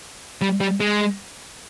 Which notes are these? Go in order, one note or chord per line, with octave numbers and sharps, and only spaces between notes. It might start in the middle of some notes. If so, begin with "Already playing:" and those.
G3
G3
G#3